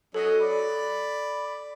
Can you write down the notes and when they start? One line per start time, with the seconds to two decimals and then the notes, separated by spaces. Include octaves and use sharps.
0.14 F#3 C#4 A4 D#5
0.41 D5 B5